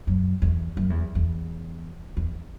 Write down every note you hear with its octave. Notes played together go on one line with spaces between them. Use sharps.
F#2
E2
F#2
E2
E2
E2